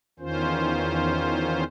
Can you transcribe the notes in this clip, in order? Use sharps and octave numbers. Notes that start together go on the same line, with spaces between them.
E2 D#3 C#4 F4 C5